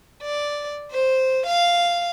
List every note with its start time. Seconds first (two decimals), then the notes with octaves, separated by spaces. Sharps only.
0.23 D5
0.91 C5
1.47 F5